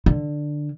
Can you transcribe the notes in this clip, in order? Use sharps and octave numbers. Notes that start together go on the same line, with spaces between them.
D3